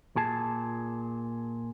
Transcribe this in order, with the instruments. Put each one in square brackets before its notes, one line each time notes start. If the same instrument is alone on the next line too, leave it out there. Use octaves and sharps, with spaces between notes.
[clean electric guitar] A#2 G#4 A5